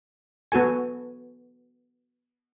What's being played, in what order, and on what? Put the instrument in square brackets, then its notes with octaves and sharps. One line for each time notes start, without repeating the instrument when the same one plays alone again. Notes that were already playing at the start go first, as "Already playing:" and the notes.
[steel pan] B3 F#4 A4 G#5